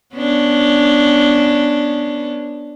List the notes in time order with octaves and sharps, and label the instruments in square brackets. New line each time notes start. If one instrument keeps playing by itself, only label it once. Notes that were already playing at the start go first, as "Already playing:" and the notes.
[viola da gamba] B3 C#4 D4